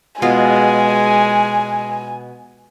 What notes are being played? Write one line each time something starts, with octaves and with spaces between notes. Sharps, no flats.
B2 G#3 F4 G#4 G#5